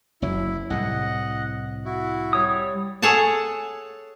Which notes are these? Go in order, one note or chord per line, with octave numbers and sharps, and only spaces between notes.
F#1 F#2 F#3 E4
C2 A2 C3 D#5 F#5
E4 F#4
G3 C#5 D#6
G#4 A4 C#5 F#5 A5